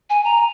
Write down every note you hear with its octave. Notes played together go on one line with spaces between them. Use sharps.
G#5
A#5